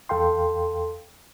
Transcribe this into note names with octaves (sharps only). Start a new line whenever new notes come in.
E2 A4 F5 G5 C6